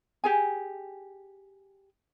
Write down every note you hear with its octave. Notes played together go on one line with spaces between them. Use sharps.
G4 G#4 G#5